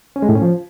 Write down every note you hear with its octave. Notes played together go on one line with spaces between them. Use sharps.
C#4
G#3
A2
C#4
F3